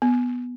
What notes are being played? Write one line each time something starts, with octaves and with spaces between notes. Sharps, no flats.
B3